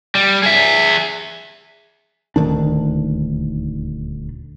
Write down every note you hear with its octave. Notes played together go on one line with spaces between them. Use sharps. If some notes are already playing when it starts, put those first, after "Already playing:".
G3
G#4 E5
D#1 D2 D#3 D4